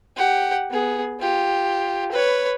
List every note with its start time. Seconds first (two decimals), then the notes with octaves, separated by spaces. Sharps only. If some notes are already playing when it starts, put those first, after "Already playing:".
0.16 G4 F#5
0.71 B3 G#4
1.20 F4 G4
2.12 B4 C#5